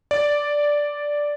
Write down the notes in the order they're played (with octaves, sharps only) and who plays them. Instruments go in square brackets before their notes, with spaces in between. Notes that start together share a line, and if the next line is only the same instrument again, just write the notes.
[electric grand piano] D5